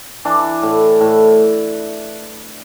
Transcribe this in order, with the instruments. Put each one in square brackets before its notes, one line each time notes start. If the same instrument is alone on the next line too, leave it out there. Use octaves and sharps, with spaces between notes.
[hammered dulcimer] E3 D4
A2
A2